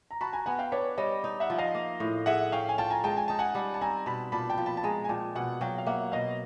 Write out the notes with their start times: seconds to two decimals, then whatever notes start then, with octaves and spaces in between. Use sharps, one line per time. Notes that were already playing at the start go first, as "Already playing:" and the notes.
0.11 A#5
0.21 F#4 A5 B5
0.33 G#5 A#5
0.46 B3 F#5 G#5
0.59 F5 G5
0.72 D4 B4 C#5
0.97 G3 C#5 D#5
1.24 D#4
1.40 E5 F#5
1.50 F3
1.58 D#5 F5
1.75 A#3
2.00 A2
2.26 G#4 E5 F#5
2.52 C#4 F5 G5
2.69 G#5
2.78 F4 G5 A5
2.90 G#5 A#5
3.03 G#3 G5 A5
3.17 G#5
3.28 D#4 A5
3.39 F#5 G#5
3.55 G3
3.74 A5
3.81 C4 G#5 A#5
4.06 B2 A5 B5
4.32 A#2 A5 B5
4.50 G5 A5
4.58 F3
4.66 A5 B5
4.77 A5
4.84 G#3 G#5 A#5
5.04 G#5
5.09 A#2 G5 A5
5.35 B2 F#5 G#5
5.61 F#3 F5 G5
5.78 F5
5.87 A#3 E5 F#5
6.12 B2 D#5 F5